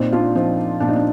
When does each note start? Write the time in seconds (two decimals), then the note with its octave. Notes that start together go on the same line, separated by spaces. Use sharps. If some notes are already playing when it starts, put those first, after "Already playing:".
Already playing: A#2 C4 D#4
0.12 D4 F4
0.35 F3 C4 D#4
0.80 A#2 D4
0.88 D#4
0.96 D4